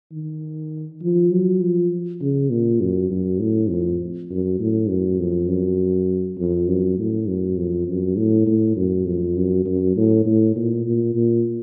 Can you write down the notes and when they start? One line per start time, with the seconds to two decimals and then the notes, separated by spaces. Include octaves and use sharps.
0.12 D#3
1.02 F3
1.31 F#3
1.61 F3
2.21 C#3
2.50 A#2
2.80 F#2
3.11 F#2
3.40 A2
3.69 F2
4.30 F#2
4.59 A2
4.89 F#2
5.19 F2
5.48 F#2
6.38 F2
6.67 F#2
6.98 A2
7.27 F#2
7.57 F2
7.88 F#2
8.17 A2
8.47 A2
8.76 F#2
9.06 F2
9.37 F#2
9.65 F#2
9.96 A2
10.26 A2
10.56 A#2
10.85 A#2
11.15 A#2